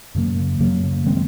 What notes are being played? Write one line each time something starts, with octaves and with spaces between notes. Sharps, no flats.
F#2 C#3 F#3 A#3
F#2 C#3 F#3 A#3
D#3 G#3 C4